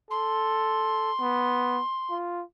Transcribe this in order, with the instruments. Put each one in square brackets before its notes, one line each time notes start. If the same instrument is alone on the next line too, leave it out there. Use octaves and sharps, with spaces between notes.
[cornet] A4 [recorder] C6
[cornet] B3
F4